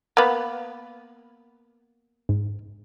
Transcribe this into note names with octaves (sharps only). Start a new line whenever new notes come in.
A#3 B3 A#5 B5
G#2